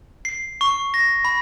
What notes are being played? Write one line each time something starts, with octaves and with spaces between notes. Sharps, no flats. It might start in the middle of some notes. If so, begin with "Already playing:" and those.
C7
C#6
A#6
B5